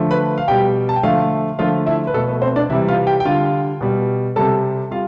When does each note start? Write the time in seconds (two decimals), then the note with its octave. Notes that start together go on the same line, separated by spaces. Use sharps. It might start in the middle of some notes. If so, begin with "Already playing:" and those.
Already playing: D3 F3 A3
0.11 B4 B5
0.38 F5
0.48 B2 G3 G4 G5
0.89 A5
0.96 G5
1.03 D3 F3 A3 F4 F5
1.59 D3 F3 A3 F4 F5
1.86 E4 E5
2.07 B4
2.14 B2 A3 A4
2.29 B4
2.42 C4 C5
2.56 D4 D5
2.70 C3 E3 G3 E4 E5
2.88 F4 F5
3.07 G4 G5
3.20 G5
3.25 D3 G3 F4 F5
3.81 B2 G3
4.36 C3 G3 A4 A5
4.91 G3 F4 F5